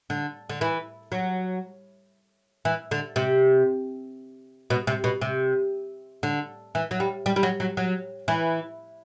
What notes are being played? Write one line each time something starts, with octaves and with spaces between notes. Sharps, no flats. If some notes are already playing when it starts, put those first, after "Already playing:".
D3
D3
E3
F#3
E3
D3
C3
B2
C3
B2
C3
D3
E3
F#3
G3
G3
G3
F#3
F#3
F#3
E3